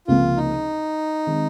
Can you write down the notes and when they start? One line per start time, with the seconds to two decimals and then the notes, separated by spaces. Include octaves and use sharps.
0.07 C#2 C3 F3 A#3 F4
0.37 D#4
1.26 D#3 G#3 C4